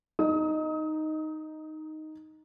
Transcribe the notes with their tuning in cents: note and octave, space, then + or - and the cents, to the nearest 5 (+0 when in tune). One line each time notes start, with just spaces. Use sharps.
D#4 +0 D#6 +35